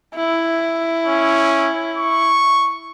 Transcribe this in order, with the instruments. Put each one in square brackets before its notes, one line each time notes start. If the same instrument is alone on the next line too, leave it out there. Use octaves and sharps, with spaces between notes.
[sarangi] E4
[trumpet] C#4
C#6